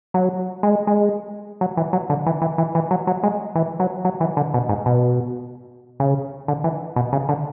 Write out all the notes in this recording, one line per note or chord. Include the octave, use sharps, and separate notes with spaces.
F#3
G#3
G#3
F#3
E3
F#3
D3
E3
E3
E3
E3
F#3
F#3
G#3
E3
F#3
F#3
E3
D3
B2
G#2
B2
C#3
D3
E3
B2
C#3
D3